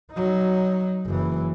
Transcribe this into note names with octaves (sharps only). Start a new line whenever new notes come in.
F#3 D#4
F#1 E3